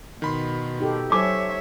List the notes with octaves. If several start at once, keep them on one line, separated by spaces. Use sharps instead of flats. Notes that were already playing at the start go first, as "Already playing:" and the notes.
B2 D#3 B5 C6
D#4 G4 A4
A4 C5 C#5 E5 G#5 D6